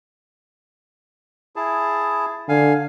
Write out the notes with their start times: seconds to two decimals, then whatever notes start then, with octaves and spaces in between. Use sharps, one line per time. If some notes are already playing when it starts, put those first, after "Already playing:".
1.56 E4 G#4 A5
2.49 D3 F5 G#5